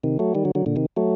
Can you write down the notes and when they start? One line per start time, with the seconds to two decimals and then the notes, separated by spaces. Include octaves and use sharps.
0.04 C3 D#3
0.19 F#3 A3
0.35 D#3 G3
0.45 D3 F#3
0.55 D3 F#3
0.66 A#2 D3
0.76 C3 D#3
0.96 F#3 A3